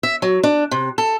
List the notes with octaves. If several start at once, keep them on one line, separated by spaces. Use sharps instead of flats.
E5
F#3
D4
C3
A4